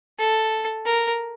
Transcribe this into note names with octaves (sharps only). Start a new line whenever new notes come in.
A4
A#4